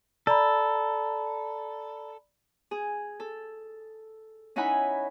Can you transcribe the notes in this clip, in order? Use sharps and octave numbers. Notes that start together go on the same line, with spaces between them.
A4 D5 A#5 B5
G#4
A4
C#4 D#4 E4 F#5 G#5 B5